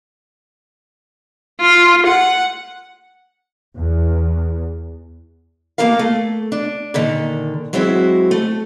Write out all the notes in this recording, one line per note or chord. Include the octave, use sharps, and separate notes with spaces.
F4
F#5
E2
A3 A#3 C4 A4 A#4 F5
A3
D4
A#2 D3 D#3
F#3 G#3 B3 C4 E4 F#4
A3